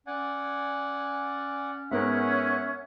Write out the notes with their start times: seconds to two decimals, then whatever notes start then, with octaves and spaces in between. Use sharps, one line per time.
0.07 C#4 D5 F#5 G#5
1.91 G#2 B3 C#4 A#4 E5 F#5